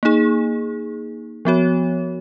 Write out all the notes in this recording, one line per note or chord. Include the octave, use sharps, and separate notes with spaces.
A#3 D#4 G#4
F3 B3 F#4 C#5